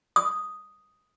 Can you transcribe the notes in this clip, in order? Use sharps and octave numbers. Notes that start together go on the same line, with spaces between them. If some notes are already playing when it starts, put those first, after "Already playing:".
D#6